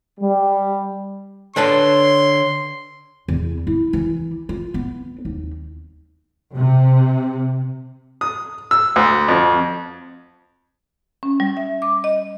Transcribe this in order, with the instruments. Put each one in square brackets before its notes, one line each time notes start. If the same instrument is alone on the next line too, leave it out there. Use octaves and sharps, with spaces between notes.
[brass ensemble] G3
[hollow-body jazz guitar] D3 B4 A5 [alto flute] C#5 [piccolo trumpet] C6
[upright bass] E2
E4
E3
F4
B3
D#2
[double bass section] C3
[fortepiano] D#6
E6
D2
F2
[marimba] C#4
G3
E5
D6
D#5